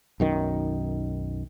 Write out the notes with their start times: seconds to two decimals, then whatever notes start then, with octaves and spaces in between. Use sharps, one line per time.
0.20 B1 F#2 D#3